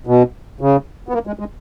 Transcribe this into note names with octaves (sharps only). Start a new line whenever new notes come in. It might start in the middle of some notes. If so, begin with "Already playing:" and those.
B2
C#3
B3
A#3
G#3
G#3